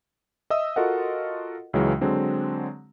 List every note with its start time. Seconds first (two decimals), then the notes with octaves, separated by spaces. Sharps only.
0.50 D#5 E5 D#6 E6
0.76 F4 F#4 A4 A#4 D#5 F#5
1.73 C#2 C#3 E3 F#3 G#3
2.01 D3 F#3 G#3 C4 D4